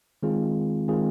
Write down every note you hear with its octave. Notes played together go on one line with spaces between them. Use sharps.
D#3 G#3 C4 F4 G#4
D#3 G#3 C4 F4 G#4